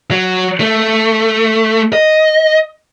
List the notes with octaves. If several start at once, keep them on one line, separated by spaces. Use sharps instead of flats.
F#3
A3
D#5